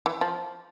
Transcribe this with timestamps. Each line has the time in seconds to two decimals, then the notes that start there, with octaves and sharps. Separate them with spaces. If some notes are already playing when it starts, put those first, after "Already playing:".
0.06 E3
0.21 F3